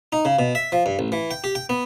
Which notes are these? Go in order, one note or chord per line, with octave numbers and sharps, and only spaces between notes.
D#4
C#3
B2
E5
F3
G2
A1
E3
G5
G4
G5
B3